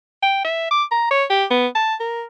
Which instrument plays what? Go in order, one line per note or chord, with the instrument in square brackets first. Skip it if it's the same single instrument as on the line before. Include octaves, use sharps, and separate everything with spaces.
[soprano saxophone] G5
E5
D6
A#5
C#5
G4
B3
A5
A#4